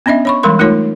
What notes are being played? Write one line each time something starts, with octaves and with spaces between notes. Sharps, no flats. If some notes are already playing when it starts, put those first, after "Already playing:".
B3 C#4 D4 D#5 E5
C#5 B5 C#6
E3 G3 G#3 A#4 B5 C6
A3 D#4 F4 A#4 C#5